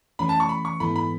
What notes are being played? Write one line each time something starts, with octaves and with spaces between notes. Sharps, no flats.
E3 A3 C#4 B5
A5
C#6
B5
C#6
G#2 E3 B3 E4 A4 B5
B5